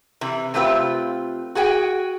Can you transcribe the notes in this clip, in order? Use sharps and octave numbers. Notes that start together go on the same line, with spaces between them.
C3 E3
C3 A3 C4 F4 G4 B4
F#4 G#4 F#5 G5